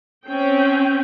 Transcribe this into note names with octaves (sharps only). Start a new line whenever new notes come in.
C4 C#4 G5